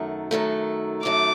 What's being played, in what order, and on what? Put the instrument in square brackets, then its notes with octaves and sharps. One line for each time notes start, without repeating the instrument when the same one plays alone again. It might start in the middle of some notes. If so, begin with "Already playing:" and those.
Already playing: [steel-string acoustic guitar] F#2 D#3 F#3 A3
F#2 D#3 F#3 A3
[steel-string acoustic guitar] F#2 D#3 F#3 A3 [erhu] D6